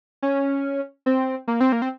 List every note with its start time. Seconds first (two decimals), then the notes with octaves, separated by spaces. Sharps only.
0.22 C#4
1.06 C4
1.48 A#3
1.60 C4
1.72 A#3
1.82 C4